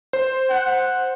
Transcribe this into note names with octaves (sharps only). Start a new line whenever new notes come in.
C5
F#5